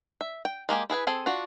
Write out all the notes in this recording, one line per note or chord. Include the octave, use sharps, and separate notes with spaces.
E5
G5
G#3 A#3 G4 G#5
E4 G#4 B4 G#5
C4 G#4 A4 G#5
D4 F4 F#4